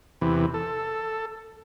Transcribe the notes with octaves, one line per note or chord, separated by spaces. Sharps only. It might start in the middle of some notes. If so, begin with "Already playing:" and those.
E2 C3 E3
A4